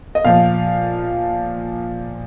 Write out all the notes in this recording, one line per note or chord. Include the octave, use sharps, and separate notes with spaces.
D#5
A#2 F3 F5